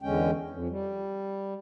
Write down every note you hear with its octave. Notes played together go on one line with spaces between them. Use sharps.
E2 D3 G#3 C#4 G5
F2
G3